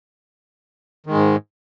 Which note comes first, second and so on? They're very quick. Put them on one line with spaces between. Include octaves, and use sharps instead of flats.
D#3 G#3 G#2